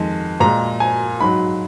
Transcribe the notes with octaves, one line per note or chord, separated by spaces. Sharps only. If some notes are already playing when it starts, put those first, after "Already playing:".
Already playing: F2 D#3 G#3
A#2 G#3 A#5
G#5
G#2 F#3 B5